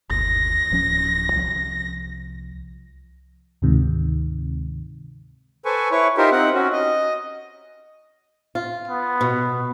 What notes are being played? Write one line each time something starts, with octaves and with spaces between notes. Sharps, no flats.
G1 D#2 A#6
D1 F3 C#4
C2 F3
D2 G#2 C3 D#3
A4 B4 C5 G#5 C#6
E4 B4 C#5 C#6
D#4 F4 G4 A#4 C5 E5
C4 D#4 F#5 F#6
C#4 F#4
D#5
F4
B3
B2